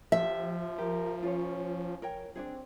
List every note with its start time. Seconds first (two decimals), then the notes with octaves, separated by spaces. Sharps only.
0.12 F3 G4 E5
0.78 G4 A#4
1.23 C#4 F4 C#5
2.02 A#4 C#5 G5
2.35 C4 D4 D#4 G#4